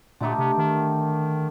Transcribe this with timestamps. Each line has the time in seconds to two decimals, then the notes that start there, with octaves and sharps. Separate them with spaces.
0.21 A#2 D3 A3 D#4 G4
0.39 C3
0.58 D#3